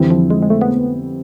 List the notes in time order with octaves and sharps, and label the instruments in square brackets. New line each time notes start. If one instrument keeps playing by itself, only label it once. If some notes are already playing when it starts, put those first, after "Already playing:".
Already playing: [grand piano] F2 D3 G3 C4 E4 [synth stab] E3
[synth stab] F3
G#3
G#3
A3
B3